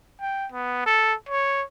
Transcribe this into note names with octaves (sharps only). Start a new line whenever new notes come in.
G5
B3
A4
C#5